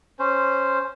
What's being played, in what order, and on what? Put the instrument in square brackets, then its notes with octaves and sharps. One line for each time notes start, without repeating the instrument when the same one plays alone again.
[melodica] C#4 C5